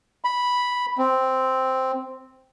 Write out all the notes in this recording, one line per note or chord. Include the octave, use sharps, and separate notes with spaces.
B5
C4